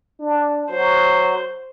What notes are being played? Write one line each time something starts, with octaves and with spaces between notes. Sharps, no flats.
D4
F#3 C5